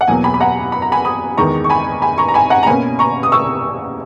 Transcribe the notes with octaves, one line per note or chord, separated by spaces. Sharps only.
F#5
E2 B2 F#3 A#3 G#5
G#5 B5
B5
F#5 A#5
B5
A#5
G#5 B5
B5 D#6
E2 D#3 G#3 B3 A#5 C#6
C#6
G#5 B5
G#5 B5
A#5 C#6
A#5
G#5 B5
F#5 A#5
A#5
B2 A#3 C#4 G#5 B5
A#5 C#6
D#6
C#6 E6